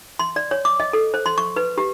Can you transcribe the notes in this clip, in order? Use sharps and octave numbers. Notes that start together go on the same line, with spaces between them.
C6
D5
C#5
D6
D#5
A4
C5
C6
C#6
B4
G4